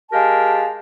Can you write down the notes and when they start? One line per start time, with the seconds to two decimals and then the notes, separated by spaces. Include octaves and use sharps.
0.11 G#3 G4 A#4 F5 A5